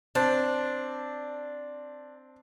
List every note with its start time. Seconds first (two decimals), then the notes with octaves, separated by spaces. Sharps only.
0.15 C4 D4 A5